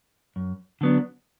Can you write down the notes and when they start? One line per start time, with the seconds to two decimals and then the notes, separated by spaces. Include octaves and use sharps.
0.36 F#2
0.81 D3 F#3 B3 D4